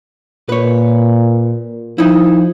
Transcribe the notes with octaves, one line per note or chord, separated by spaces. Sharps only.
A#2 B4 C#5
F3 D#4 E4